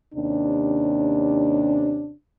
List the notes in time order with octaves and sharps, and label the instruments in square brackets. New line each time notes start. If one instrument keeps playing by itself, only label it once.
[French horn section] D#2 C3 C#4 D4